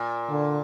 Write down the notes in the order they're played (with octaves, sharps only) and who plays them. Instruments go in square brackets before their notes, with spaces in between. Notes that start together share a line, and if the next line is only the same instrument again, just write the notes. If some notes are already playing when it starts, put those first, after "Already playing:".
Already playing: [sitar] A#2
[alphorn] D3